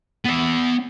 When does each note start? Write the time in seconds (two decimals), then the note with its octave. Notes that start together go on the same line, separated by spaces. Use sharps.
0.24 B3 E5